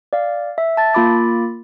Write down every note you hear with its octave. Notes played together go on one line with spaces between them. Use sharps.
D5 F5
E5
A5 A6
A#3 F4 B5 D6 A6